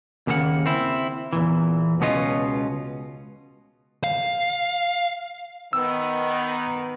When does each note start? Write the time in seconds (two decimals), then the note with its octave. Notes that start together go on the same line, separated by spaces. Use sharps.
0.27 D#2 C#3 A#3 A4 F#5
0.66 C4 E4
1.33 E2 A#2 E3
2.00 C#2 B2 B3 C#4 F4 D#5
4.04 F5
5.73 D#3 B3 E6